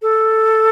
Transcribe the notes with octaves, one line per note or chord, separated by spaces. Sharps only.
A4